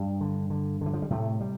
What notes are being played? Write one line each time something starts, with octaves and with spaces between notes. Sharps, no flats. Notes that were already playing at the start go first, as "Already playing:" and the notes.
Already playing: G2 G3
D3
D3
D3 E3
F3
G3
A2 C3 A3
G3